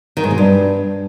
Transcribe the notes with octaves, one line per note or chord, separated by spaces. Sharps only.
D#3
G#2
B2
G2